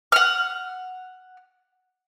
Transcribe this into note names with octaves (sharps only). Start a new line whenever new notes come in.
F#5 F6